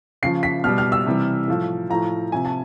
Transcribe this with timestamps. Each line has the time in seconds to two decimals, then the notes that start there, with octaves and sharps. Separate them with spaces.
0.23 C#3 F3 C7
0.43 B6
0.64 B2 G3 F6
0.78 F6
0.92 E6
1.06 C3 E3 G3
1.48 A2 F3
1.89 A2 F3 A#5
2.32 C3 F3 G#5
2.45 A5